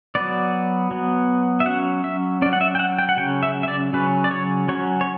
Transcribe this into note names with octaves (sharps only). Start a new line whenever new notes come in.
F#3 B3 D5
F#3 B3
E5
F#3 C#4 F#5
E5
F#3 C#4 D5
F#5
E5
G5
F#5
G5
F#5
C#3 F#3 C#4 G5
E5
E5
D5
C#3 F#3 C#4 B4
D5
C#5
F#3 C#4 C#5
C#5